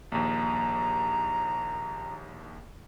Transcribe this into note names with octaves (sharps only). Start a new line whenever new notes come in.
A#1 D#2 A#5